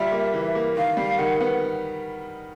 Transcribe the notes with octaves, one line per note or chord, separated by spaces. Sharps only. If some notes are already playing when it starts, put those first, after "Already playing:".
Already playing: G3 F4 E5
A#3
E3
A#3
D#3 F5
G3
D#3 F#5
B3